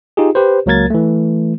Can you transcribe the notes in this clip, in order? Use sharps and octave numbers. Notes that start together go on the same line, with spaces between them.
D#4 F4 G4 G#4
G4 B4 C5
C#2 F#3 A#3 A#4 G#6 A6
E3 A3